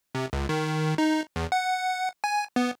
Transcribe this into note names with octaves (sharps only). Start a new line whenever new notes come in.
C3
C#2
D#3
D#4
E2
F#5
G#5
B3